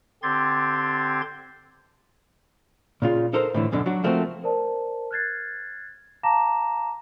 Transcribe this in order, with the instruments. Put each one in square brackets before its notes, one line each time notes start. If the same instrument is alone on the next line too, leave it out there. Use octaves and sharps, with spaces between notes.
[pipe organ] D3 C4 G4 C6 G#6 A6
[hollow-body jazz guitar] A#2 C#3 F4
D#4 A4 A#4 C5
A2 D3 E3
F#2 B2 D3
F#3 D4 F#4
F3 A3 A#3 C4 F#4
[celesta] A#4 C5 D5 A5
F6 F#6 G#6 A6 C7
F5 A5 A#5 D6 A#6 E7